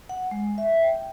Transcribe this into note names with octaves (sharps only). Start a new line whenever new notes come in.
F#5
G#3
E5
G5